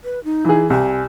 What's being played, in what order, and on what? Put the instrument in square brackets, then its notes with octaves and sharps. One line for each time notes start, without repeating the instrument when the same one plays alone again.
[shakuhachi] B4
D#4
[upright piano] E3 G#4
[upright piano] C2 [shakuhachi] G#5